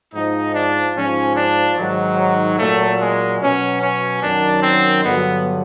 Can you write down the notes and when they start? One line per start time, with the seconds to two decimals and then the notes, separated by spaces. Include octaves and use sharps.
0.14 G#2 F3 D#4
0.55 D4
0.96 G#2 F3 C#4
1.36 D4
1.77 G#2 D#3 F#3
2.59 A#2 F#3 A3
3.00 G#3
3.41 B2 F#3 C#4
3.82 C#4
4.22 F#2 D#3 F#3 D4
4.63 C4
5.03 G2 D3 F#3 B3